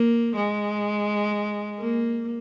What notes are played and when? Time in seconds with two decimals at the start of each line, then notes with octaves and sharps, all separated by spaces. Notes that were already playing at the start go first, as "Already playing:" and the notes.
Already playing: A#3
0.37 G#3
1.79 A#3